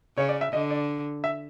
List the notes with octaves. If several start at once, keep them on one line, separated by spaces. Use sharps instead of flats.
C#3 C#5
D5
E5
D3 D#5
D5
E5